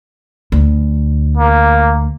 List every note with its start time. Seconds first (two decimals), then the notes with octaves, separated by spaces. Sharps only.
0.52 D2
1.37 A#3